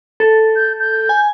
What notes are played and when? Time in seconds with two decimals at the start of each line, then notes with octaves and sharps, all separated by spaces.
0.20 A4
0.56 G6
0.80 G6
1.09 G#5